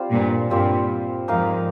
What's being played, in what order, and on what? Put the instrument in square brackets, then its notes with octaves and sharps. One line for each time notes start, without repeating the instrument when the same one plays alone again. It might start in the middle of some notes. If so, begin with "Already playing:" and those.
Already playing: [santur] G3 C4 F4 C5
[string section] G2 A#2
[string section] G2 A#2 [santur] G3 C4 F4 C5
[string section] F2 G#2 [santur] A#3 D#4 A#4 F5